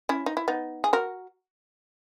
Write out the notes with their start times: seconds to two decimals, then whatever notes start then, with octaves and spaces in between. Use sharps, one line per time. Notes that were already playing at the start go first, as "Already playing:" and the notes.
0.09 C#4 E4
0.26 D#4
0.37 E4
0.48 B3 D#4
0.84 G#4
0.93 F#4 A#4